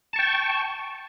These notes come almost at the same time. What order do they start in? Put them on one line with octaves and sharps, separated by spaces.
A5 C#6 G5